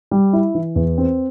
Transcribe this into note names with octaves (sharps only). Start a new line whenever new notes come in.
G3
E4
E3
E2
C4